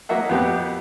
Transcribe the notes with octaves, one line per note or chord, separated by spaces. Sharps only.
F#3 A#3 D#5 E5 F#5
F2 B3 G4